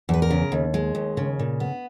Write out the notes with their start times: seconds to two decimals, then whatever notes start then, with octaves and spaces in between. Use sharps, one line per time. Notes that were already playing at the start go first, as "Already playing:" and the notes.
0.09 E2 B4
0.22 A#4
0.31 C#3
0.52 D#2
0.74 G#3
0.95 D#2
1.17 C#3
1.39 A#2
1.60 B3